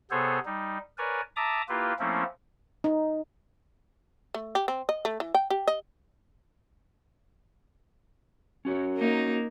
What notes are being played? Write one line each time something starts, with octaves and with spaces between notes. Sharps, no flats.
C3 B3 G#4 A4 C5 C#5
G3 D#4
A#4 B4 C#5 D5 G#5
E5 A5 A#5 D6 D#6
A#3 E4 F4 G4 B4
F3 A3 A#3 C4 C#4 E4
D#4
A3
G4
C4
D#5
A3
E3
G5
G4
D#5
C#4 F#4 C#5
A#3 D#4